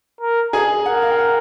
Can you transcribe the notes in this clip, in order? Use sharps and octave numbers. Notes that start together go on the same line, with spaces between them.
A#4
G#4 G#5
A#4 F#5
F5
G5
F#5